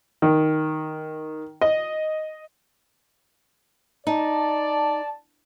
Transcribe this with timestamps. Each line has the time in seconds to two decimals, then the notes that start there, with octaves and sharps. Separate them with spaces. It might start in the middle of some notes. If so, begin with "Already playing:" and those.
0.22 D#3
1.62 D#5
4.07 D#4 D5 A5